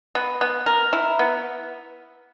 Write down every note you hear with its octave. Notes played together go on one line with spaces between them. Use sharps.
B3
B3
A#4
E4
B3